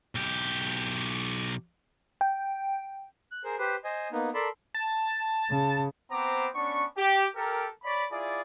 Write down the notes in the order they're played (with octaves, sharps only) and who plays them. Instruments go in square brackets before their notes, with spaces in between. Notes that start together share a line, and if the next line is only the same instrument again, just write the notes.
[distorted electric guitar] B1 G4
[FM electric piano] G5
[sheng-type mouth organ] F#6
G#4 A#4 C5
G4 B4 C5
C5 D#5 G#5
A#3 B3 D#4
A4 A#4 D5 A5 B5 C6
[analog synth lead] A5
[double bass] C#3
[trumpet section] B3 C4 C5 A#5 D6
B3 C#4 D4 C#6
G4
G4 A4 A#4
C#5 D5 B5
E4 F4 G#4 D5